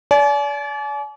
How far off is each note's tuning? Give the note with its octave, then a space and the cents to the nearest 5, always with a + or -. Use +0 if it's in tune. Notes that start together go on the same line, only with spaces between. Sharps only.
D5 -35 G#5 +40